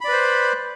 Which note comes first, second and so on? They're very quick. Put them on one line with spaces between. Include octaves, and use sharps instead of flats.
B5 D5 B4 C5